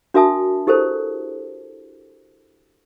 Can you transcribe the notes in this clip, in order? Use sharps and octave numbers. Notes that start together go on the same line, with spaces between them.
D4 F#4 A#4 E5 A5 D#6
E4 G4 A4 A#4 C5